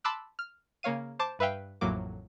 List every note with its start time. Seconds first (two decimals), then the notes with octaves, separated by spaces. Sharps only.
0.04 A5 B5 C6 D6 E6 F#6
0.39 F6
0.83 C#3 A#3 C#5 F5 D#7
1.19 C5 A5 D6
1.39 G2 B4 E5 F5 G5
1.81 A1 F2 A2 F#3 A#3 D6